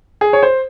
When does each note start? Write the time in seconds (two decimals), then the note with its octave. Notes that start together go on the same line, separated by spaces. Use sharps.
0.21 G#4
0.33 C#5
0.43 C5